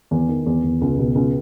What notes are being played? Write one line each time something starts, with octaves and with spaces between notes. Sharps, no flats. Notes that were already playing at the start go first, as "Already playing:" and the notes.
E2
D#3
E2
E2
C#2
B2
C#2